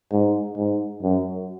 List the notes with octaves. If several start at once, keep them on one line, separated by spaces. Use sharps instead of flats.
G#2
G#2
F#2